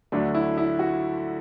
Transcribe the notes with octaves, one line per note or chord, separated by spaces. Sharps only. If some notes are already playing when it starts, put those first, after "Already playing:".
D2 D3 F#3 A3 D4
E4
E4
F#4